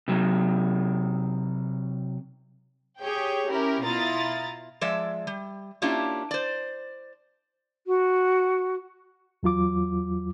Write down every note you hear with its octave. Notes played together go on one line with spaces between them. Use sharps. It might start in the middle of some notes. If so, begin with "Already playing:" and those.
C3 F#3
G4 G#4 C#5 G5
C#4 E4 G4 A#4
B2 E4 F4 A#5 D#6 A6
F3 G#3 D5 E5
G3
A#3 C#4 D4 E4 F4 G4
C5 D5
F#4
E2 F#3 F4 D6